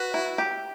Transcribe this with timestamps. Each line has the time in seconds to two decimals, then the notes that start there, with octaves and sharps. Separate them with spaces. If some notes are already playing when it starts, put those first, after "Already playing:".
Already playing: F#4 B4
0.14 E4
0.38 G4